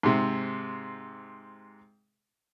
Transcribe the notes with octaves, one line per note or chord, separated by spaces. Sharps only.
G#2 C3